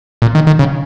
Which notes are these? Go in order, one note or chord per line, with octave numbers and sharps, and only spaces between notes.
A#2
D#3
D#3
C#3